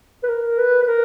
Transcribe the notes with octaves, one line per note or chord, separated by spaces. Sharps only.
B4
A#4
B4
B4
A#4